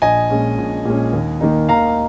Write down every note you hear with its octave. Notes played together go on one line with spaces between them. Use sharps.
A#1 D#5 G#5
A#2 G#3 C#4
A#1
A#2 G#3 C#4
D#2
D#3 A#3 D#4
D#2 F5 A#5